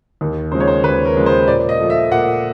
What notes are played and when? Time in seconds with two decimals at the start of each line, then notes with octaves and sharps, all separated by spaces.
0.21 D#2
0.52 C#3 F3 G#3 C5
0.60 C#5
0.68 C5
0.84 D#2 B4
1.05 A#4
1.16 C#3 F3 G#3
1.26 C5
1.48 A#2 D5
1.69 D#5
1.80 F3 A3
1.90 E5
2.12 A#2 F#5